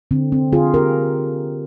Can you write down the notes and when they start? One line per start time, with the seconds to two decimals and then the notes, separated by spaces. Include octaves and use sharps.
0.11 D3 C4
0.32 C4
0.53 D3 F4 G#4
0.74 G4 A#4